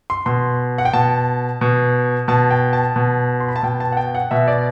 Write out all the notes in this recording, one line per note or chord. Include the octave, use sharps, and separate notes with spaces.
C6
B2 C6
F#5
G5
B2 A5
B2
B2 A5
G5
A5
B2
C6
B5
A5
B2 G5
A5
F#5
G5
F#5
B2 E5
D5